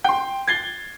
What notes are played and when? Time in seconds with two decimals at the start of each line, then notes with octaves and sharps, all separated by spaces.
0.04 G5 C6
0.48 G#6 A6 C7 G7